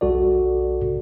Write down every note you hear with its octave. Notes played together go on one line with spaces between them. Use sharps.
B1 G3 F#4 A4 D5